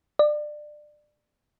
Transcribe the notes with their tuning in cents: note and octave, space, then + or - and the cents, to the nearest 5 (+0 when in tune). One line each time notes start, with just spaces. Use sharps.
D5 +25